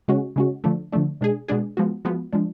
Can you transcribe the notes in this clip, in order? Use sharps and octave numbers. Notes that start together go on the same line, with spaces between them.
C#3 G#3 C#4 F#4
C#3 G#3 C#4 F#4
D3 F3 A3 D4
D3 F3 A3 D4
B2 G#3 D4 G#4
B2 G#3 D4 G#4
F3 G#3 B3 F#4
F3 G#3 B3 F#4
F3 G#3 D4